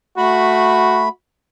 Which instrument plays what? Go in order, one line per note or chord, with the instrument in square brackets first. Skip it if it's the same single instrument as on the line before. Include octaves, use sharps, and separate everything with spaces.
[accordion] A3 B5 [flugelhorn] F#4